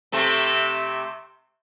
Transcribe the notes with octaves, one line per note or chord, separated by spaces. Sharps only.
C3 A3 C4